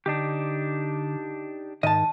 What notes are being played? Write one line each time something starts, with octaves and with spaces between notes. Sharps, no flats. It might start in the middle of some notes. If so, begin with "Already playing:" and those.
D3 D4 D#4 G4
G#2 D#3 D#5 A5